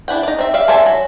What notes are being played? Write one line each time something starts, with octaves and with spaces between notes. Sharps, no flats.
D4 E4 F#5 G5
D#4 D5
C4 E5
D5 E5 F5
A4 C5 D5 E5 G#5
F#3